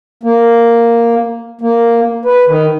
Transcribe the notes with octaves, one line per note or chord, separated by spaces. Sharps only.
A#3
A#3
B4
D#3